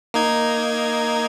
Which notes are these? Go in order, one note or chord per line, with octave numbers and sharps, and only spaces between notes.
A#3 D#4 G#6